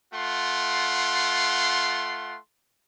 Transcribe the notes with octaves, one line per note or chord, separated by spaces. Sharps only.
A3 F4 F#5 C6